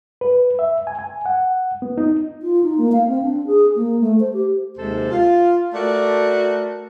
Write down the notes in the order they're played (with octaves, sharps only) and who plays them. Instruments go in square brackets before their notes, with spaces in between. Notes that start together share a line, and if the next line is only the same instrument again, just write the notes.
[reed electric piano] B4
E5
G#5
G#5
F#5
B3
D#4
[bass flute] F4
D#4
A#3
F5
C4
D4
G#4
A#3
A3
C5
G4
[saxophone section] D#2 C3 G#3 A4 C5
F4
A3 F#4 A#4 D5